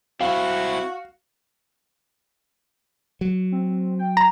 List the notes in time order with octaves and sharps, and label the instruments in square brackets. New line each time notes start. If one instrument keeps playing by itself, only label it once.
[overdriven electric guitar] C4 E4 [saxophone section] F#4 [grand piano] F5
[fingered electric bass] F#3
[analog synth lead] C4
G5
[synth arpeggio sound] A#5